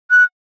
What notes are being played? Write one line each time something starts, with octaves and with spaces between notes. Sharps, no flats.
F#6